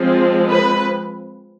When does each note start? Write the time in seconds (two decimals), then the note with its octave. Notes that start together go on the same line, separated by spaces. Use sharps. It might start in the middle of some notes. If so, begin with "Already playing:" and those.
Already playing: F3 G#3 C4
0.48 B4